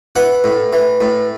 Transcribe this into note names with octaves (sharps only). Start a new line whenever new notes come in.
E3 F#5
A2
E3
A2